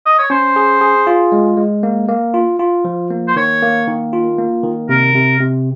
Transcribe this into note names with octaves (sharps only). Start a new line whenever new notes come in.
D#5
C#5
C#4 C5
G#4
G#4
F4
G#3
G#3
A#3
A#3
F4
F4
F3
A#3
C5
D#3 C#5
A#3
D#3
F4
A#3
D#3
C3 A#4
C3
C3